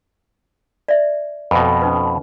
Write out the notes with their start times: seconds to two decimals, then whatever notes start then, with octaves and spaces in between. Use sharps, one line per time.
0.88 D5 E5
1.51 F2 B2 A4 B4 B5
1.81 C#4 D#4 B4